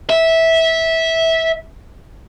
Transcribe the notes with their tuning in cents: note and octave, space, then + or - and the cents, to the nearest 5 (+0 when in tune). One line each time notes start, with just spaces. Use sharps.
E5 -15